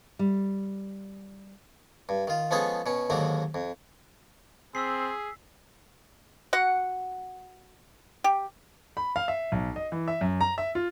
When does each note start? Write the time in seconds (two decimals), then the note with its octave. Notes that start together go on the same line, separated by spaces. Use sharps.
0.19 G3
2.09 G2
2.27 D#3 F4
2.51 F3 G#3 B3 C#4 G#4 A4
2.86 B2 C#4
3.10 D#2 G#2 D3 D#3 F#3 A#3
3.54 F2
4.75 C4 G#4 E6 B6 C7
6.53 F#4 F#5
8.24 G4
8.97 B5
9.16 F5
9.28 E5
9.52 B1
9.76 D#5
9.92 E3
10.08 E5
10.21 F#2
10.41 A#5
10.58 E5
10.75 F4